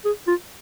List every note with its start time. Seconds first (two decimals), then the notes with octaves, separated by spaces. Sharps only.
0.05 G#4
0.27 F4